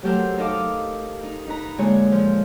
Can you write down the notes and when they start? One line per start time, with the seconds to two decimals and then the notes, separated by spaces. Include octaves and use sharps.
0.03 F#3 A3 G4 A4 A#4 C5
0.38 D#4 A4 A#4 D#5 F5 D6
1.23 D#4
1.47 D#4 B4 A#5
1.78 A#2 D3 G#3 C#5 G#5
2.12 F3